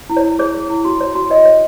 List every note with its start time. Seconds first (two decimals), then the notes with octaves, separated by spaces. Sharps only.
0.10 E4
0.17 C#5
0.24 E4
0.39 G#4 C#5
0.54 G#4
0.70 E4
0.85 F#4
1.01 C#5
1.15 F#4
1.30 C#5 D#5
1.45 C#5